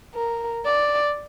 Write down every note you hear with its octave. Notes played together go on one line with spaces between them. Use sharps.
A#4
D5